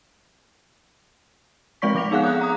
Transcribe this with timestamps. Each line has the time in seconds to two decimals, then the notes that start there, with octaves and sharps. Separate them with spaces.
1.82 F3 G#3 C4 D5 C#6 B6
1.95 F3 D6 A#6 F7
2.11 B3 D#4 G#4 F5 F#5 F#6
2.23 D#6 F#6
2.41 A#5 D#6